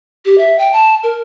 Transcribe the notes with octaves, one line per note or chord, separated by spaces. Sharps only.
G4
E5
G5
A5
A#4